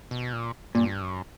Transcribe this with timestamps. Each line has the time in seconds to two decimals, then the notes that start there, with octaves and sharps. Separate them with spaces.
0.11 B2
0.33 A#2
0.75 G2 A#2
1.02 F#2